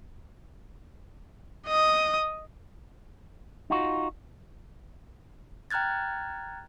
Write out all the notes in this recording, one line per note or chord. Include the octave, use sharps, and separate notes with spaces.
D#5 D#6
D#4 F4 F#4
G5 A#5 F6 F#6 G#6 A6